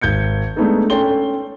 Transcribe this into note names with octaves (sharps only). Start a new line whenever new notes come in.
G#1 G6 G#6 C#7
G#3 A3 B3 D4 D#4 A4
C#4 A4 G5 C6 G7